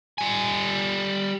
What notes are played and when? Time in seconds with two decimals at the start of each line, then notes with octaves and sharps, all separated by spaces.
0.18 G3 G#5